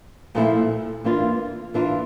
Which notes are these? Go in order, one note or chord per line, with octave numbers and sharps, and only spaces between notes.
A#2 F3 A3 E4
E3 A#3 D4 F4
E3 A#3 D4 F4